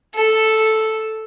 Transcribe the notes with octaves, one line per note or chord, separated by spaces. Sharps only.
A4